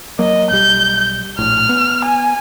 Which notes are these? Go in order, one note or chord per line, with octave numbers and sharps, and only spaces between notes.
F#3 A#3 D#5
B1 G3 G6
A#1 A2 F6
B3
G#5